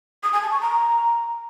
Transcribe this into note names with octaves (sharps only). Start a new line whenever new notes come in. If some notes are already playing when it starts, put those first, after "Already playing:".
D#6
G#5
A5
C#6
A#5